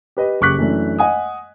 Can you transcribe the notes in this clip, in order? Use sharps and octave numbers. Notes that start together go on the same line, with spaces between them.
G4 B4 D#5
F#1 G4 C#6 D6 F#6 B6
F#2 E3 A3 D4
D#5 F#5 G#5 D#6